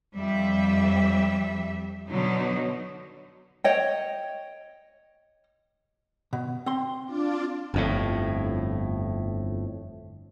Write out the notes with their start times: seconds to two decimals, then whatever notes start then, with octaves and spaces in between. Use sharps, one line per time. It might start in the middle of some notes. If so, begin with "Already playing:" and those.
0.15 F2 G3 E5
2.08 B2 D3 F#3 D#4
3.64 C#5 D#5 G5
6.33 B2
6.66 C4 C6
7.05 D4 F4 D5
7.74 G1 F2 A2